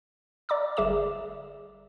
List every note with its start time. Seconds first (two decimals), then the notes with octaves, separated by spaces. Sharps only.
0.49 D5 A#5 D6 E6
0.77 G1 G3 G#4 E5 D6 E7